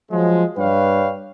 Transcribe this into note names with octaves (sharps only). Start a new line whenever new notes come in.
F3 F#3 G#3
G2 B4 C#5 D5 F5 G5